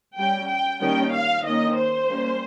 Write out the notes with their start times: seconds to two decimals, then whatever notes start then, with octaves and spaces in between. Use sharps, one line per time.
0.18 G3 C#4 G5
0.49 G5
0.80 D#3 G3 A#3 C#4 G5
1.12 F5
1.45 D#3 A#3 C#4 D#5
1.76 C5
2.08 G3 A#3 C#4